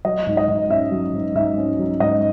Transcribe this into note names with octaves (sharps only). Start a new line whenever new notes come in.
F#3 D#5
G#2
D#5
G#2
C#4 E5
F#3
G#2
G#2 E5
C#4
F#3
G#2 D#5